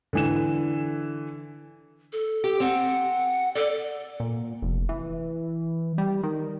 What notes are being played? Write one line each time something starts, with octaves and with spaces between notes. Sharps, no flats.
D3 E3 E7
A4
G4
C4 F#5
A4 D5
A#2
F1
E3
G3
D#3